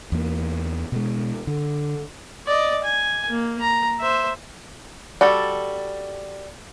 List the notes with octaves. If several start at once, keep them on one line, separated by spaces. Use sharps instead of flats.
E2 A#3
B2 G#3
D3
D5 D#5
G#5
A#3
A#5
C5 E5
G3 F#4 A4